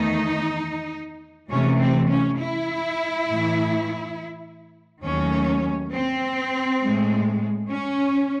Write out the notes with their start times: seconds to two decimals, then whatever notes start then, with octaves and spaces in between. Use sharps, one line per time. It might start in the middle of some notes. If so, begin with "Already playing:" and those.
Already playing: E2 D#3 A3 D#4
1.50 C3 E3 A3 C#4
1.79 C4
2.09 C#4
2.39 E4
3.27 A2 E3 A3
5.04 D#2 D#3 F#3 A3 C#4
5.93 C4
6.82 A2 G#3
7.70 C#4